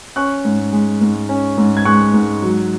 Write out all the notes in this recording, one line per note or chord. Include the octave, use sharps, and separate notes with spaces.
C#4 C#6 F#6
G#2
G#3
G#2
C#4
G#2
G#6
G#3 C#6 F#6
G#2
F#3